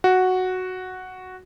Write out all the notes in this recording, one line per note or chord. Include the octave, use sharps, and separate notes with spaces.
F#4